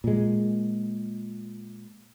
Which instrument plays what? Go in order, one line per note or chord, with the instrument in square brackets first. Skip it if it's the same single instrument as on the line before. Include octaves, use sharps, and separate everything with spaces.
[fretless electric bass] A#2 G#3